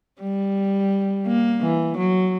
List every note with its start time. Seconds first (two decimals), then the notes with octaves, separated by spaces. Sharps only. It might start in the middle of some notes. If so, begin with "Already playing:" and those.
0.21 G3
1.27 A#3
1.62 E3
1.97 F#3